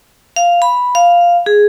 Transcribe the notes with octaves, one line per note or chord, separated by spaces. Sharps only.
F5
B5
F5
G#4